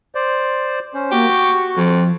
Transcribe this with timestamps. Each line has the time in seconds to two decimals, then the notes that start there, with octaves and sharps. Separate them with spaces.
0.15 C5 D5
0.94 C#4 C5
1.12 A#3 F#4 G4
1.30 C#6
1.77 F2 F3